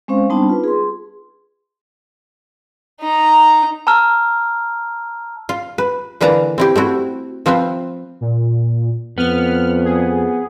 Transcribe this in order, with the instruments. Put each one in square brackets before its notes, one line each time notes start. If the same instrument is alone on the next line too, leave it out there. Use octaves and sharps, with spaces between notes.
[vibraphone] G#3 C4 C#4 C5 F5
G3 B3 C4 D4 D#4 A5
F4 B4
G#4 C6
[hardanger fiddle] D#4 A#5
[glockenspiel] A5 A#5 E6 F6
[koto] F4
B4
D3 E3 A#3 B4 A5 A#5
C4 E4 G4
A3 C4 E4 F#4
F3 C4 F4 B4 E5
[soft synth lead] A#2
[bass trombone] F2 [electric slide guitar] B3 [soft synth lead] F6
[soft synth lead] G#4